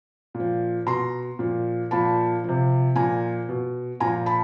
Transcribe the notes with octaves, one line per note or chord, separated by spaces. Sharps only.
A#2
F3
B2 A#5 C6
A#2 F3
A#2 F3 A5 B5
C3 F3
A#2 F3 G#5 A#5
B2
A#2 F3 G#5 A#5
A5 B5